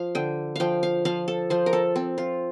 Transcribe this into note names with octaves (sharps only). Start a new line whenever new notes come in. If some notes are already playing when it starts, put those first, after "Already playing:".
Already playing: F3 F5
D3 G5
F3 F5 G5
F5
F3 F5
A4
F3 C5
A#4
A4
C4
F4